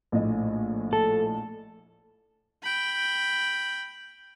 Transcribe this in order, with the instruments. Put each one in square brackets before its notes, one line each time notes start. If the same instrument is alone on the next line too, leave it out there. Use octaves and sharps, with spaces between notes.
[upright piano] A#1 A2 D#5
[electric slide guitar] A4
[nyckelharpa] G5 B5